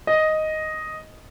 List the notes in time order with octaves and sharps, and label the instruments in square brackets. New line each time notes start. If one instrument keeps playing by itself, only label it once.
[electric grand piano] D#5